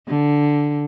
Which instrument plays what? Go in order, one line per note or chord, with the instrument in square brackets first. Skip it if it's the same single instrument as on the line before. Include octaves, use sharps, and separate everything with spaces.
[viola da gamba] D3